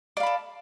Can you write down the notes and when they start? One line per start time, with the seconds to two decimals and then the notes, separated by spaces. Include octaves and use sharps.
0.17 D5
0.20 F5
0.23 B5
0.26 A4